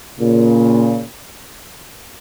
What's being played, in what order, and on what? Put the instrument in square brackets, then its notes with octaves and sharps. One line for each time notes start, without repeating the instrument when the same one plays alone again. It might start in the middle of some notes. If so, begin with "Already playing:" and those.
[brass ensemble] A#2 C#3